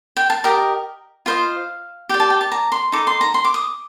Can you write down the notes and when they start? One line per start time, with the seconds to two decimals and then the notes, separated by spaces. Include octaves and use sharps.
0.17 G5
0.30 A5
0.44 G4 A#4 D#5
1.26 F4 C5 D#5 F5
2.09 G4 D5 G5
2.20 A5
2.30 G5
2.41 A5
2.52 A#5
2.72 C6
2.92 D#4 A4 D6
3.07 C6
3.21 A#5
3.34 C6
3.44 D6
3.54 D#6